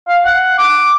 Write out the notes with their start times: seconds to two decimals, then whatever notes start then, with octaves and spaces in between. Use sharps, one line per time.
0.08 F5
0.25 F#5
0.58 D6